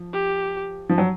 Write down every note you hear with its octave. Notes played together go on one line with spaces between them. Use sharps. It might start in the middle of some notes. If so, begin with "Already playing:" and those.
Already playing: F3
G4
F3
F#3